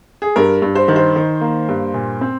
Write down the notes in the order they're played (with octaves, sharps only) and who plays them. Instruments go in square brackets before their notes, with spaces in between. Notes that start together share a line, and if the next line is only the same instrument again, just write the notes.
[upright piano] G#4
G2 A#4
G2
C5
D#3
C5
D#3
A#3
G2
A#2
C4